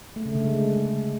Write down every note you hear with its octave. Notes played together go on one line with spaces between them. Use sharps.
A3
C#3
D3
G#3